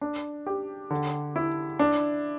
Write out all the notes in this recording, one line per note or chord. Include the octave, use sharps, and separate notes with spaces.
D4
G4
D3
E4
D4